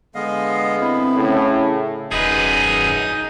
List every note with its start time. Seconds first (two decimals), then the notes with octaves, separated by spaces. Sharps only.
0.15 D3 G#3 B3 D#5 F5
0.80 C4 E4
1.16 A2 C#3
2.11 D#1 F#2 D#4 G#4 B4 D#6